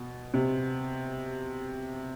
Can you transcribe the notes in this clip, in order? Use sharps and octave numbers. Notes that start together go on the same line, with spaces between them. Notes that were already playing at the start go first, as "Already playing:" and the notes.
Already playing: B2
C3